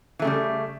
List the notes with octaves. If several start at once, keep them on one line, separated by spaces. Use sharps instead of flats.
C#3 E3 G3 A3